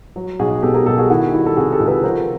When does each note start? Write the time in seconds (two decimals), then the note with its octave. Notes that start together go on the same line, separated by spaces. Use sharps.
0.16 F#3
0.39 B1 F#4 G#4
0.63 B2 G4 A4
0.74 G#4 A#4
0.86 B1 G4 A4
0.98 F#4 G#4
1.10 D#3 E4 F#4
1.33 G3 E4 F#4
1.46 A4
1.57 C3 F#4 G#4
1.72 G4 A4
1.80 C#2
1.88 A4 B4
2.03 F3 A#4 C5